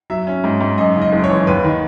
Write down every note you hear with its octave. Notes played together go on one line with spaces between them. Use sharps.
F#3 E5
C#4
G#2
G#2
F#2 D#5
C#3
D#5
F#1
C#5
E3
D#2 B4
D#3